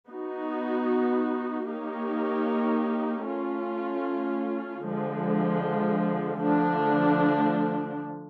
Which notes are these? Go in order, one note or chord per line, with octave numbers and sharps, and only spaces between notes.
B3 D#4 F#4
A#3 D#4 G4 A#4 C#5
A3 C#4 F4
D3 F3 G#3
D3 F3 A3 D4